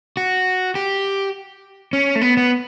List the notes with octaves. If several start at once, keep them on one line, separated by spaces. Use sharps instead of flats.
F#4
G4
C#4
A3
B3
B3